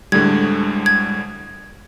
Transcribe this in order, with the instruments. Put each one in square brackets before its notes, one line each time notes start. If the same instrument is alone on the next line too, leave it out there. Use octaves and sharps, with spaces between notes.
[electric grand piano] D2 A2 D3 [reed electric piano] G3 G#3 [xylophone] G#6
[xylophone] G#6